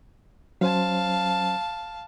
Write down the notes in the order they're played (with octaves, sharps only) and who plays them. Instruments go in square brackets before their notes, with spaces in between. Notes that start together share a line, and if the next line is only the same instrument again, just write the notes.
[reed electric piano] F#3 C#4 C5 [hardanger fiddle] F5 A5